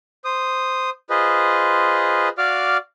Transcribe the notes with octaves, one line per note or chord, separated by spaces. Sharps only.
C5 D#6
F4 G#4 B4 C5 D#5
F#4 D5 F5 D6 F6